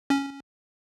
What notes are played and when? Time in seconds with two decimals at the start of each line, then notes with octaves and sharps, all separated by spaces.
0.10 C#4